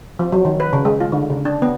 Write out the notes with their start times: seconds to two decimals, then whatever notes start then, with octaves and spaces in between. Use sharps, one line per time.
0.19 F3
0.32 F#3
0.45 D#3
0.60 B4
0.73 C#3
0.85 G#3
1.00 F4
1.12 D3
1.30 C#3
1.45 D4
1.62 B3